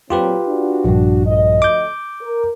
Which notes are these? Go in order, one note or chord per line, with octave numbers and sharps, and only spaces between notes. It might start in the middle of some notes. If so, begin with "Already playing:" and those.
A#2 F#3 C4 F4 G4 B4
D4 F#4
A#1 G2
D2 F3 D#5
D6 G6
A#4